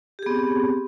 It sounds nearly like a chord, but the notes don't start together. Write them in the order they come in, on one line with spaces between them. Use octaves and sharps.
G4 G#4 B3 C4